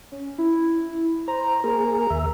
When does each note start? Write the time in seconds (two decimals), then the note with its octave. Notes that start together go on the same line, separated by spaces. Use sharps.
0.12 C#4
0.38 E4
1.28 C5 A#5
1.64 A#3 G#4 A#4
2.10 D#2 E5